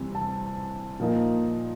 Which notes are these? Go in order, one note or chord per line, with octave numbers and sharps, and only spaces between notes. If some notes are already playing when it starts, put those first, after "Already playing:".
Already playing: C3 E3 G3 C4
A5
A#2 F3 A#3 D#4